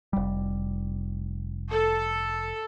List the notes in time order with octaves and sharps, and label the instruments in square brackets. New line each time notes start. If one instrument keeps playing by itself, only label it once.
[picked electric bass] F1 G3
[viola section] A4